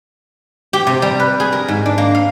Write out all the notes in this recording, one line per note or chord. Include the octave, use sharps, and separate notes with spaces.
G4
C3
G3
B4
G#4
A#4
G#2
D4
A#3
F5